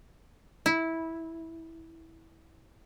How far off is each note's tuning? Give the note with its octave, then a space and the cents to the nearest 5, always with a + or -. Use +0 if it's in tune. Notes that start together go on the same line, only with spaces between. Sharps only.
E4 -15